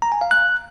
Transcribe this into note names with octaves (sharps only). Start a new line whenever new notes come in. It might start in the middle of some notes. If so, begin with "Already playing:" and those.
A#5
G#5
F5
F#6